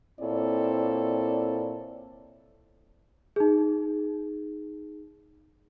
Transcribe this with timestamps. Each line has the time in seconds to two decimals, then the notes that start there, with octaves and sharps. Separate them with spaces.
0.21 A#2 C4 E4 A4 C#5 D5
3.36 D#4 G#4